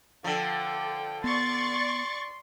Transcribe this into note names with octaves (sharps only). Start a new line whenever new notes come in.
D3 F3 A4 G5
B3 D5 C6 C#6 A6